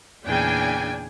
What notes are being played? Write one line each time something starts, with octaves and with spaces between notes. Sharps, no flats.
E2 A#2 C#3 D4 G5 G#5